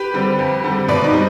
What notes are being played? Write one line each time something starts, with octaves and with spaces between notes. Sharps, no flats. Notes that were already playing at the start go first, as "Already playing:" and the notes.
Already playing: G4 B4
D3 G3 C4
F2
D3 G3 C4
B2 B4 D5
D#4
G3 C4